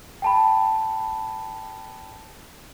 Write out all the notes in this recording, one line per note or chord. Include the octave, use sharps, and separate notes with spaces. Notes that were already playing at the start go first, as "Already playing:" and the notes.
G5 A5 B5